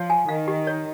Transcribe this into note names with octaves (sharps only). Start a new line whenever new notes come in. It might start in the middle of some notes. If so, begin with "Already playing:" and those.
Already playing: F3 C#5
G#5
D#3 F5
G4
C#5